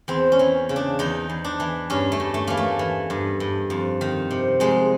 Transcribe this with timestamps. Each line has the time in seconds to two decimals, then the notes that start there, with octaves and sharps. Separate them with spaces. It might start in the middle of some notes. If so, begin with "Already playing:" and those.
0.08 E2 C4
0.32 C#4
0.39 E3
0.69 C#3
0.76 D4
0.99 E2 D#4
1.29 E2
1.44 D4
1.60 E3
1.90 G2 C#4
2.12 A3
2.20 G2
2.34 A3
2.47 E3 A#3
2.57 A3
2.79 E3
3.10 G2
3.40 G2
3.70 F2
4.01 D#3
4.31 C3
4.60 F2 G#3